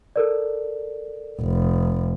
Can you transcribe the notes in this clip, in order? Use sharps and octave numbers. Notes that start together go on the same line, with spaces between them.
A4 A#4 D5
F1